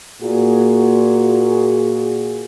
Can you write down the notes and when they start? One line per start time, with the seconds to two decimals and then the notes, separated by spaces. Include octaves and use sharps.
0.22 A#2 F#4 G#4